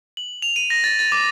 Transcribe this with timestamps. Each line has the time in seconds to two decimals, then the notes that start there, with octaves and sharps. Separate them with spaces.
0.17 F#7
0.42 F7
0.56 D#7
0.70 A#6
0.84 A6
0.99 A6
1.12 D6